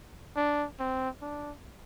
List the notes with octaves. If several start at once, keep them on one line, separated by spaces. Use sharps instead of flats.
D4
C4
D4